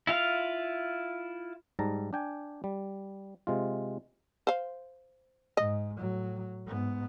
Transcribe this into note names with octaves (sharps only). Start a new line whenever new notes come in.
E4 F4 F5
G#2 G3 A5 A#5
D4 G5 G#5
G3
C3 G#3 F4
C5 F5
G#2 D#5
A2 F#3
G#2 B3